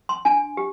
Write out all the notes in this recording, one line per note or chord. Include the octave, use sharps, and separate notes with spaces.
C6
D4 G#5
G4